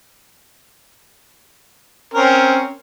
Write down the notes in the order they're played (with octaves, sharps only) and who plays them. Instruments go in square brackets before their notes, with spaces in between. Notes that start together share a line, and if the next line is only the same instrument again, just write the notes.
[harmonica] C4 C#4 A#4